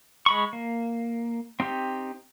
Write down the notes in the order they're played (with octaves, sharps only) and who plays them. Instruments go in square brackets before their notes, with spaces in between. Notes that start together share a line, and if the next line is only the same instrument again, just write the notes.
[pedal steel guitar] G#3 B5 C#6
A#3
C4 D#4 G4